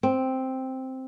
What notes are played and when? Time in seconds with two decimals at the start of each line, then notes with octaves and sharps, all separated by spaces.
0.03 C4